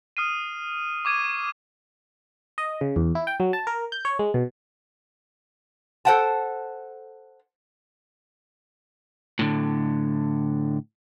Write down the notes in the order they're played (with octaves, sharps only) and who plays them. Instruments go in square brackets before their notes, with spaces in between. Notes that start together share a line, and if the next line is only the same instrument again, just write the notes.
[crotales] D#6 F6 C7 D#7
C#6 D6 G#6 D#7
[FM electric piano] D#5
C#3
E2
E4
G5
F#3
A5
A#4
G6
C#5
G#3
B2
[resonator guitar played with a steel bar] A4 C5 D#5 F#5 G5 A5
[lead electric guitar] A2 D3